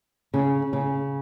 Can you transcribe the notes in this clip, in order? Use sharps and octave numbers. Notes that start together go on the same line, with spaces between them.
C#3
C#3